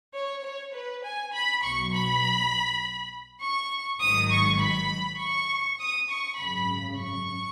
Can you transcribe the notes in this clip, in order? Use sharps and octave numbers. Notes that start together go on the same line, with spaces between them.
C#5
C#5
B4
G#5
B5
B1 B2 F#3 C#6
B5
C#6
G#1 G#2 D#3 F#3 D#6
C#6
B5
C#6
D#6
C#6
G#1 F#2 C#3 B5
C#6